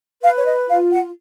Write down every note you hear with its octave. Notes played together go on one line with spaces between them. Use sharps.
B4 F5
C#5
D#5
F4 F5
F#5